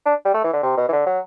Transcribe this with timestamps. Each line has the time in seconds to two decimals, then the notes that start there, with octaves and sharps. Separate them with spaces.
0.05 D4
0.25 G3
0.34 A3
0.44 E3
0.53 D3
0.63 C3
0.77 B2
0.88 E3
0.92 D3
1.06 F#3